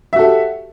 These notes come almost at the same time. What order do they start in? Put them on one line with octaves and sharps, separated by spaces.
E5 F#4 A4 G4